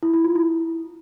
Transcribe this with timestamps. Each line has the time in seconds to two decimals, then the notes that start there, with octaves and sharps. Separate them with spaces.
0.03 E4
0.14 E4
0.24 F4
0.35 E4